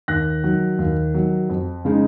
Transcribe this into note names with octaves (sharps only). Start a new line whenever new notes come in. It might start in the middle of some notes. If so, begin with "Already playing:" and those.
D#2 F#6 A#6
D#3 F#3
D#2
D#3 F#3
F2
C#3 G#3 D#4